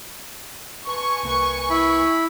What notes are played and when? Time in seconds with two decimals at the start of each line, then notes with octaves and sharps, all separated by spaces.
0.87 B4 G#5 A5 C6 C#6
1.23 C2 A#3 B4
1.70 E4 B5